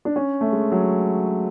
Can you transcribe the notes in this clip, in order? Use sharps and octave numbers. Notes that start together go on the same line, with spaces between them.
D4
C#4
A3
G#3
F#3